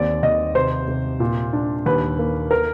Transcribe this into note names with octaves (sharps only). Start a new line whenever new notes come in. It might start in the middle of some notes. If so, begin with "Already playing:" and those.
Already playing: D#2 C4 D5
D#2 D#5
C3 C5
C3
A#2
D4
D#2 B4
A#3
A#4